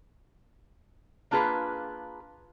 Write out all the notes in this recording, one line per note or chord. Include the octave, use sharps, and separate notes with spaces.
A#3 D4 F4 G#4 B4